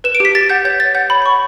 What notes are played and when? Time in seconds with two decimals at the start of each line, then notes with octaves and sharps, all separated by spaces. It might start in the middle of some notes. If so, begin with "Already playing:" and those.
0.04 B4 E7
0.15 D7
0.20 G4 B6
0.35 G4 A6
0.50 F#5 G6
0.65 C#5 G6
0.79 C#5 A6
0.95 F#5 G6
1.10 C#5 B5
1.22 B5
1.26 F#5 C#6